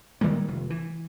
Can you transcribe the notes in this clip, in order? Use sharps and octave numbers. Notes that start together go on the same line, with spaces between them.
D#3 G3 G#3 A#3
F1
E3